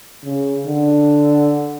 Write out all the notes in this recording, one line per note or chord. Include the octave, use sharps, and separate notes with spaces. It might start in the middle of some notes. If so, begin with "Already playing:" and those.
C#3
D3